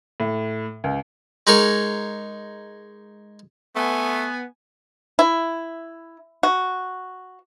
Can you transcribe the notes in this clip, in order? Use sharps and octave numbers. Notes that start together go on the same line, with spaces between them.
A2
C#2
G#3 D#4 G#4 A#4 C#5
A3 B3 G#5
E4
F#4